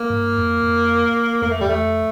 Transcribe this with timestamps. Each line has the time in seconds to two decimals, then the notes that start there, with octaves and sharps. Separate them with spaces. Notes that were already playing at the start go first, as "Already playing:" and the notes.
Already playing: A#3
0.10 G2
0.36 F2
0.63 F2
1.42 F2 A#3
1.51 A3
1.60 E2 G3
1.69 A3
1.81 F2